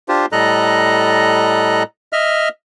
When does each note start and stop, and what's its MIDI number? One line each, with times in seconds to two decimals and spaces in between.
0.09 0.26 62
0.09 0.26 65
0.09 0.26 67
0.09 0.26 72
0.32 1.83 45
0.32 1.83 55
0.32 1.83 69
0.32 1.83 75
0.32 1.83 82
0.32 1.83 90
2.13 2.49 75
2.13 2.49 76
2.13 2.49 89